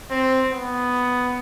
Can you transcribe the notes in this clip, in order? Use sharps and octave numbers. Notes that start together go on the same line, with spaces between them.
C4
B3